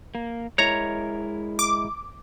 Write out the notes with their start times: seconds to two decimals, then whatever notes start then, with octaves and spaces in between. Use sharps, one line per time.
0.15 A#3
0.58 G#3 E4 A#4 C#5 A#5
1.59 D6